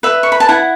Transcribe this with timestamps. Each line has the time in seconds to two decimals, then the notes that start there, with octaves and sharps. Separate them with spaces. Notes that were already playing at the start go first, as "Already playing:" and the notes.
0.03 B4 E5
0.23 C#6
0.32 B5
0.40 A5
0.49 E4 F#5